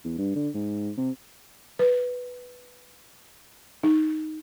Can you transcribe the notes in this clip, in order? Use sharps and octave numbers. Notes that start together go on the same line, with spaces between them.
E2
G2
D3
G#2
C3
B4
D#4